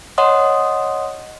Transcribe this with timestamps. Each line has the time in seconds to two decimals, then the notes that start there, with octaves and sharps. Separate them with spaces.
0.18 C#5 D#5 F#5 C6 D#6